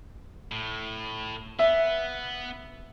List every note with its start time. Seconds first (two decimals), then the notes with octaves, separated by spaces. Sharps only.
0.52 A2
1.59 B3 E5